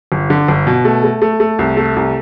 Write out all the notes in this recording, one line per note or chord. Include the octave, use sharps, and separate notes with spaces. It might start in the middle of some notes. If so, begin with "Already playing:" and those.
G1
D3
G1
B2
A3
A3
A3
A3
C2
A3
C2